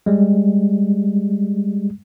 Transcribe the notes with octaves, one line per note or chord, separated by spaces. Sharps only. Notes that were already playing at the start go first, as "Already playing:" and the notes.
G3 G#3